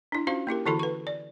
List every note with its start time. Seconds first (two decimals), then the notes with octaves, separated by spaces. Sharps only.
0.12 D4 E4
0.27 C#4 F4 F#4 C5 F5
0.47 A#3 E4 G4 A#4
0.66 D3 E3 E4 F#4 A4 B5
0.79 B4 C#6
1.07 D5